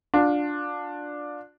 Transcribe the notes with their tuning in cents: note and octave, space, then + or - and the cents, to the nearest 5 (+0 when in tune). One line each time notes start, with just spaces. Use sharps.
D4 +0 F4 +30